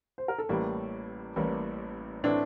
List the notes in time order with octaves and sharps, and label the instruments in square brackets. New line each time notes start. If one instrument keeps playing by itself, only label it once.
[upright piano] C5
A#4
A4
[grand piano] A1 A2 E3 G3 A#3 [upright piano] G4
[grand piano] A1 A2 E3 G3 A#3
[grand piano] A2 E3 A3 C4 E4 [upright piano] D4